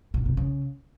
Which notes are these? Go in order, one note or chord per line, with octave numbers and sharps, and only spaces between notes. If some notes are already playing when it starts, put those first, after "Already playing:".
A#2
C3
C#3